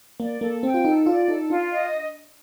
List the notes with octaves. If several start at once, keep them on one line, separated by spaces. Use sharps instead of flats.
A#3 D5
A#3 A4
C4 G5
F4
D#4 A4
F4 D5
D#4 A4
D4 F4
D#5